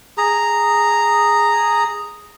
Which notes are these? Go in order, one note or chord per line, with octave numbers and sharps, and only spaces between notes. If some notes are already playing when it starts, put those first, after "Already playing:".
G#4 A#5